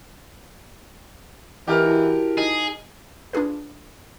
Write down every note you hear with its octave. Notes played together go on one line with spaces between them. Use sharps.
E3 G4 A#4 D#5 F#5 G5 F6
E4 F#4 A5
D#4 G#4
D4 F4 G#4 B4